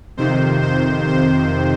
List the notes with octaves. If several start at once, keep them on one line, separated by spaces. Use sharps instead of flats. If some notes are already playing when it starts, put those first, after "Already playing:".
F2 C3 D#3 C5
C5
C5